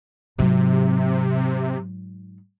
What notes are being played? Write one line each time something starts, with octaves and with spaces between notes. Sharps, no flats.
G#2 C3 F#3